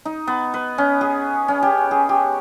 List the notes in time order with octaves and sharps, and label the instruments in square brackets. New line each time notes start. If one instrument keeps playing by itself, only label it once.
[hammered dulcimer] D#4
B3
B4
C#4
G#4
C#4
G4
G#4
G4